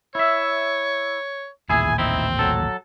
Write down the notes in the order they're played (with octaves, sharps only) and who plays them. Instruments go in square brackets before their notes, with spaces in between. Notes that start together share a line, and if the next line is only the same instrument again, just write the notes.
[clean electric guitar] E4 E5 [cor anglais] C#5
[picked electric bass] A1 D#2 A#2 [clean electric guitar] E4 G#4 [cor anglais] G#5
[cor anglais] C4 [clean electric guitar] D#4 E4
[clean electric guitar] F#3 A4